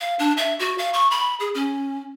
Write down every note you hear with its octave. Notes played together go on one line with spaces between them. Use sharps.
F5
D4
E5
F#4
F5
C#6
B5
G#4
C#4